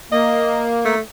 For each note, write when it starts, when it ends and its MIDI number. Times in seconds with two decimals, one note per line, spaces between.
0.12 0.95 58
0.12 0.63 75
0.85 1.00 57